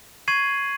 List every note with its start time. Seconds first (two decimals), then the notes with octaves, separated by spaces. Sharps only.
0.28 C#6 G#6 C7 D#7 F#7